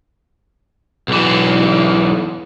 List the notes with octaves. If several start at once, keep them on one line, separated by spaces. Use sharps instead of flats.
B1 E3